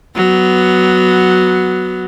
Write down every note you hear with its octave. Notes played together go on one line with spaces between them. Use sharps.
F#3 B3